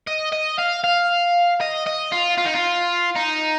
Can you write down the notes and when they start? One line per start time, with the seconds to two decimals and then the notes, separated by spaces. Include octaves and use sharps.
0.07 D#5
0.32 D#5
0.58 F5
0.84 F5
1.61 D#5
1.87 D#5
2.12 F4
2.38 F4
2.46 D#4
2.54 F4
3.15 D#4